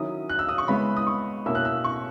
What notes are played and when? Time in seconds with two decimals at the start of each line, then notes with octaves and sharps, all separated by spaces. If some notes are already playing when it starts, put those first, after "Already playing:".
Already playing: D#3 F#3 C#4 E4 D#6
0.29 F#6
0.39 E6
0.49 D#6
0.58 C#6
0.67 C#3 G#3 B3 E4 B5
0.97 D#6
1.07 C#6
1.46 B2 A#3 C#4 E4 E6
1.55 F#6
1.65 E6
1.84 C#6